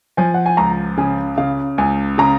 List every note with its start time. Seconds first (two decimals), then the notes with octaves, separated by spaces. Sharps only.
0.17 F3 G#5
0.34 F#5
0.46 G#5
0.57 C#2 A#5
0.97 C#3 G#5
1.38 C#3 F5
1.78 C#2 G#5
2.18 C#3 A#5